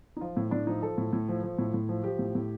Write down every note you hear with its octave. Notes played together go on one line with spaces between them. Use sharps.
D#4
F3 F4
A2
A2 D4
F3 D#4
F3 A4
A2
A2
F3
F3
A2
A2
F3
F3 G4
A2
A2